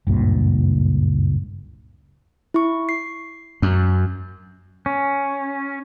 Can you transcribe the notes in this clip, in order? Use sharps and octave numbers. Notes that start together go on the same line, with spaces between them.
F#1 C#2 G2 A#2
E4 C#6
C7
F#2
C#4